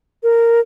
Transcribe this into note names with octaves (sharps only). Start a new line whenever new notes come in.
A#4